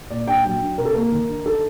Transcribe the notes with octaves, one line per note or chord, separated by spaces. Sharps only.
A#2 D5
D4 G5
F#3 G5
D4
C3 A#4
A4
A#3 A#4
D#3
D4
D#4 A4